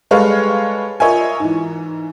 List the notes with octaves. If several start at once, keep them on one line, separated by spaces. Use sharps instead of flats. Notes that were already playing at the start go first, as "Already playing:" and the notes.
G3 G#3 A4 B4 C#5 F5
F4 A#4 C#5 D#5 E5 G#5
G#2 E3